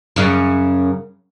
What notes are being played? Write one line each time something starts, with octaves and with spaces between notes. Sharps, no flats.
F#2 C#3 C#4